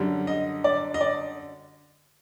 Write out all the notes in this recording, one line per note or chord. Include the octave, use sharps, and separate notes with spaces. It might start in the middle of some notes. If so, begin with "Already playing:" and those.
Already playing: F#2 D3 G3
D#5
D5
D#5
D5